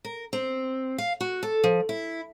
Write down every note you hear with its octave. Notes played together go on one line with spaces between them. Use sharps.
A#4
C4
F5
F#4
A4
F3
E4